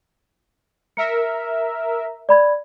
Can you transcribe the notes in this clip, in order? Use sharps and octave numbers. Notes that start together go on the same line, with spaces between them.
A#4 E5 C#7
D5 B5 G#6